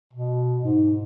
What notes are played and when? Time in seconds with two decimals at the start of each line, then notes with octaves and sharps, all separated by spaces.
0.13 B2
0.65 G#2